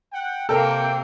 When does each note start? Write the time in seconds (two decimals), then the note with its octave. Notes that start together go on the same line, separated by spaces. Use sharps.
0.13 F#5 G5
0.49 C3 A#3 A4 A#4 G5